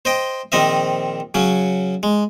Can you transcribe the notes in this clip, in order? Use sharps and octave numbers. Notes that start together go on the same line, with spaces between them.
C5 D#5 G5
A#1 D#3 C4 D#5 E5
C#3 F#3 C#4
G#3